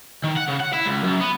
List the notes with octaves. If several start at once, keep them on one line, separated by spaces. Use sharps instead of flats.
D#3
F#5
C#3
F#5
E4
C#2
F#2
B3